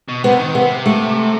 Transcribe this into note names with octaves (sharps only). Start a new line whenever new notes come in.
B2
C3 B3
D#3
C3 B3
A3